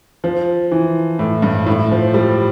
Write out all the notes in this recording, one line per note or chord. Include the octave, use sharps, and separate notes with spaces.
F3
E3
A2
G2
A2
F3
G3